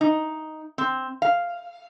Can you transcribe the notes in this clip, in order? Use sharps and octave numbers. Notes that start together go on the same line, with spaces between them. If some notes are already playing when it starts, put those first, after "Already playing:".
D#4
C4
F5